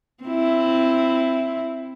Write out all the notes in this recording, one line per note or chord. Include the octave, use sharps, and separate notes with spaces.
C4 E4